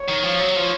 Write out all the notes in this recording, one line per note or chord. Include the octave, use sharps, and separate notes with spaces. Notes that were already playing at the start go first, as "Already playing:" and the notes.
Already playing: C#5
D#3
F3
F#3
F3